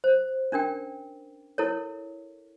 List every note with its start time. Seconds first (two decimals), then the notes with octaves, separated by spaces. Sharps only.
0.04 C5
0.52 C#4 D4 A#4 G5
1.58 E4 A4 A#4 C#5